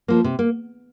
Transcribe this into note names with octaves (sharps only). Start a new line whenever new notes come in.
F3 A#3
C3
A#3